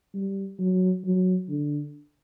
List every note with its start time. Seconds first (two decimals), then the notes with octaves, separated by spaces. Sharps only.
0.14 G3
0.59 F#3
1.04 F#3
1.49 D3